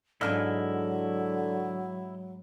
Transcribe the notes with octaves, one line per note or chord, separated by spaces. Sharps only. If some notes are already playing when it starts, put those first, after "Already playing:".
G#2 D3 F#3 D4 E4 D#5 G#5 F6